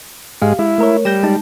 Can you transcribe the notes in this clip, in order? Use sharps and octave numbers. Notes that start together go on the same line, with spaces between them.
G#2 G#3 G4 F5
G#3 E4
A3 A#4 C#5
G3 G6 A#6 E7
G#3 D#4 A5